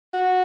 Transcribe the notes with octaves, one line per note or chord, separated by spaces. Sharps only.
F#4